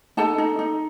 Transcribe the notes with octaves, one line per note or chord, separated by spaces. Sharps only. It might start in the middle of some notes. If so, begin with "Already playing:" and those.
D#4 A4 A5
D#4
D#4